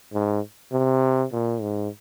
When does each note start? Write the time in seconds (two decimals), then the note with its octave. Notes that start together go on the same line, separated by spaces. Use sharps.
0.13 G#2
0.72 C3
1.33 A#2
1.62 G#2